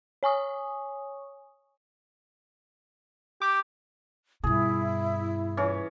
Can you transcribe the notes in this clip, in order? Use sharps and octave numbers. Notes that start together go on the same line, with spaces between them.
C#5 G#5 C#6 D#6
G4 D6
G2 B2 E4 G#4
E3 C#4